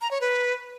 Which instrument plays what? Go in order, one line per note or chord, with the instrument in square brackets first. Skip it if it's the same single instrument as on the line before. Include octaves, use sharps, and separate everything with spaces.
[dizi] A#5
C#5
B4